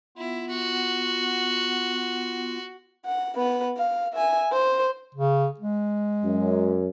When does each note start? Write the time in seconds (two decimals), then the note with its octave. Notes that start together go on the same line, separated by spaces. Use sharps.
0.17 B3 E4 F4
0.50 F#4
3.06 F#5
3.37 B3 B4
3.77 F5
4.14 E5 G#5
4.52 C5
5.15 C#3
5.59 G#3
6.24 F#2